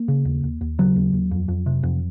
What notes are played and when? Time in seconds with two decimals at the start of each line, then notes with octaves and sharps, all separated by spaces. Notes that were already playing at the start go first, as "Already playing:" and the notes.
Already playing: A#3
0.08 C#3
0.25 D#2
0.43 D#2
0.61 D#2
0.79 C#3 F#3
0.96 D#2
1.13 D#2
1.31 F2
1.48 F2
1.66 C3
1.83 F2